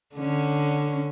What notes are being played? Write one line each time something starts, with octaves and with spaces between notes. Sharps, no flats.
D3 C#4